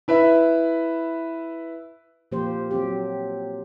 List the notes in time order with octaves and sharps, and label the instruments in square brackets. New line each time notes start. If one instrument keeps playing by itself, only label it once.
[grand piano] E4 B4 E5
[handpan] A#2 F3 A#3 G4 C5
F#3 C4 G4